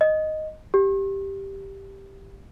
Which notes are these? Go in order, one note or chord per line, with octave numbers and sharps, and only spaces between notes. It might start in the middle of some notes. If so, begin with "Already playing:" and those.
D#5
G4